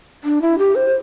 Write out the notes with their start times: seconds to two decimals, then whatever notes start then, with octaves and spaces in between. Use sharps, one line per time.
0.24 D4
0.42 E4
0.58 G4
0.75 C5